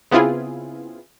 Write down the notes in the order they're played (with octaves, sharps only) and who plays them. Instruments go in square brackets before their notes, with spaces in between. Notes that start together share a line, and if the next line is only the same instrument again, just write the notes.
[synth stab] C#3 B3 C4 E4 F4 G#4